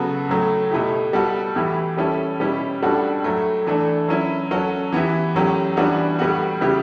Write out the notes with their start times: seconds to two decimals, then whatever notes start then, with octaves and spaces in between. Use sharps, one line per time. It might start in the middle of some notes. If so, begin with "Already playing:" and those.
Already playing: C#3 F#3 B3 F#4 A4
0.29 A2 F#3 A3
0.71 B2 A3 E4 G4
1.13 G3 B3 F#4 A4
1.55 A2 E3 B3 E4 G4
1.97 G3 C#4 E4 A4
2.40 B2 G3 C#4 E4 G4
2.82 A2 G3 D4 F#4 A4
3.24 A2 F#3 A3
3.67 E3 A3 D4 A4
4.09 F#3 C#4 E4
4.51 F#3 C#4 F#4 A4
4.92 E3 B3 E4 G4
5.35 A2 F#3 C#4 G4
5.77 E3 G3 B3 D4 F#4
6.19 A2 G3 B3 F#4
6.61 C#3 G3 B3 E4 G4